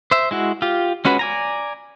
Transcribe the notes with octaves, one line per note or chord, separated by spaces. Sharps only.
C5 E5
G#3 E4 F#4
F4 G4
G#3 C#4 F#4 B4
D5 G#5 A#5